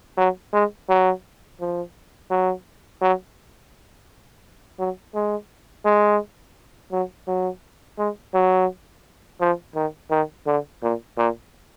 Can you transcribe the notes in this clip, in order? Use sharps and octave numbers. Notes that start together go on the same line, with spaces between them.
F#3
G#3
F#3
F3
F#3
F#3
F#3
G#3
G#3
F#3
F#3
G#3
F#3
F3
D#3
D#3
D3
A#2
A#2